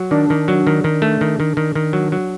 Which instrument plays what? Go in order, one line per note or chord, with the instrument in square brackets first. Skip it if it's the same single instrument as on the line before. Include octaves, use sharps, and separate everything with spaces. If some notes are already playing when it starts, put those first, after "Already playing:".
Already playing: [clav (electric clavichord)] F#3
[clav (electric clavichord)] D#3 [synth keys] D4
[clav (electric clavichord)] D#3
F#3
D#3
D#3
A3
D#3
D#3
D#3
D#3
F#3
F#3